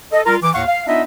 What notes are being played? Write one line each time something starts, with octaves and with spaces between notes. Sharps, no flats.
A4 D#5
G3 F4 A#4
E3 D6
D#2 A2 F5 F#5 C#6
F5
B3 D4 D#4 F4 D#5 E5